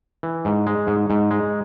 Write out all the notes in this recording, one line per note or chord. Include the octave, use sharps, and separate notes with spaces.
E3
G#2
G#3
G#2
G#2
G#3